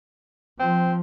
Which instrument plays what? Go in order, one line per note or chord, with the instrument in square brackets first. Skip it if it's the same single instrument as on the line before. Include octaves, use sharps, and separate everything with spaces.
[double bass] F3 [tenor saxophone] C4